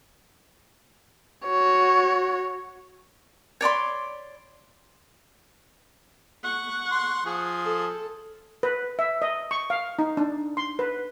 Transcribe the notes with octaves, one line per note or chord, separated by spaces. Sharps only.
F#4 C#5
C#5 D5 B5 C6
F#5 C#6
C6
F3 G#4
A4
B4
E5
D#5
C#6
F5
D#4
D4
C6
B4